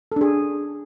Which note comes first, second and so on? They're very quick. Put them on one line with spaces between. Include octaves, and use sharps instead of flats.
A4 D4 G#4